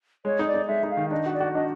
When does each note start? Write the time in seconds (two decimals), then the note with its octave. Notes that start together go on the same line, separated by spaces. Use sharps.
0.25 G#3 C#5
0.39 D#4
0.47 D5
0.54 D#4
0.68 G#3 E5
0.83 D#4
0.91 F5
0.97 D#3
1.11 D4 D#5
1.26 F#4
1.34 D5
1.40 F#4
1.54 D4 D#5